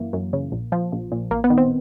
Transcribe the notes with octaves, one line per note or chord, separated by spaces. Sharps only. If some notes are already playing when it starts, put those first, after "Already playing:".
Already playing: F#2 E3 A#3
F#2
C#3
A#1
F3
A#1
A#2
A1 A#3
B3
D#3
C4